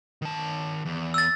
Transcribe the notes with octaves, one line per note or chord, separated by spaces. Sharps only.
D#3 A5
E2
E6 A6